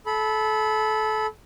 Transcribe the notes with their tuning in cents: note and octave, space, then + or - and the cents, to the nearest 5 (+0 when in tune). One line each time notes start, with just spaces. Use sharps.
A4 -25 B5 +0